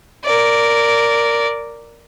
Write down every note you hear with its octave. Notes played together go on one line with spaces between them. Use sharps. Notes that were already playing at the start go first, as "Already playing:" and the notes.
A#4 D5